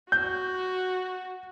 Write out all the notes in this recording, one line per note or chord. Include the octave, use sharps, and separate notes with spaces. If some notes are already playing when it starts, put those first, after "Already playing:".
F#4 G6